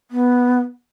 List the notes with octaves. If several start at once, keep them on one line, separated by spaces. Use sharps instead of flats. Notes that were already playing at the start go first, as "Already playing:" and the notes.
B3